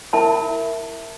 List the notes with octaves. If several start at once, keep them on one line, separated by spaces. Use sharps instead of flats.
E4 A#4 E5 A5 B5